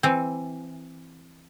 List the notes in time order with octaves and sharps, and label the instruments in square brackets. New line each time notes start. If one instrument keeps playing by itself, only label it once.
[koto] E3 C4